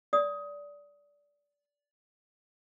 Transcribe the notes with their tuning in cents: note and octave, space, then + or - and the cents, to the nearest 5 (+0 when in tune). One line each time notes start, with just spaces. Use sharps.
D5 -20 D#6 +15